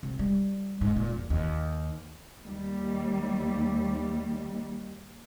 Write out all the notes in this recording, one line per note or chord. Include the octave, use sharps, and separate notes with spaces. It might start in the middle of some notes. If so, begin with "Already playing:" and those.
C2
G3
G#2
A#2
E2
D#2
D#2 G3